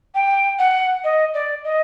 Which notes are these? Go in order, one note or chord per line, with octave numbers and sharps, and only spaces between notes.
G5
F#5
D#5
D5
D#5